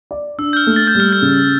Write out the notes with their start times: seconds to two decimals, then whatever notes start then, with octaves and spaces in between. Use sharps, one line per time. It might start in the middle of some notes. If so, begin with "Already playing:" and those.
0.11 D5
0.38 D4 E6
0.53 G6
0.57 F6
0.67 A3
0.76 A6
0.87 G6
0.95 G3 F6
1.13 G6
1.22 C#3